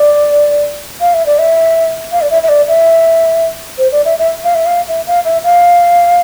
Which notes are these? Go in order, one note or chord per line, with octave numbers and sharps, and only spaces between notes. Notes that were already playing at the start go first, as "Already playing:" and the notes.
Already playing: D5
F5
E5
D5
E5
F5
D5
E5
E5
D5
E5
C5
D5
E5
E5
F5
E5
F5
E5
F5
E5
F5